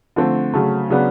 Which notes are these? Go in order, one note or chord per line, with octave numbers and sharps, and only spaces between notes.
D3 F3 A3 C4
C#3 F#3 A3
C#3 F#3 B3 D4